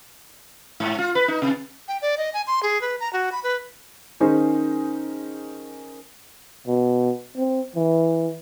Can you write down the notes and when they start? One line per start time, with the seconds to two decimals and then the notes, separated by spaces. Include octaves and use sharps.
0.80 G#2
0.98 F4
1.15 B4
1.28 D#4
1.42 C3
1.88 G5
2.02 D5
2.18 D#5
2.33 G#5
2.47 C6
2.63 G#4
2.81 B4
3.00 A#5
3.13 F#4
3.32 B5
3.44 B4
4.20 D#3 C#4 D#4 G#4 C5
6.67 B2
7.37 C4
7.75 E3